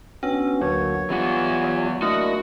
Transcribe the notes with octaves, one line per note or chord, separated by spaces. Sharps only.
B3 C#4 D4 F#4 E6
D2 F#3 A#3 F#4 C#5
E3 G3 B3 F4 F#5
A3 A#3 D4 E4 F#4 D#5 D#6